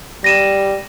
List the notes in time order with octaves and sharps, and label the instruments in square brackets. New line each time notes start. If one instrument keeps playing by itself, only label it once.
[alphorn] G3 [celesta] A#6 D#7 E7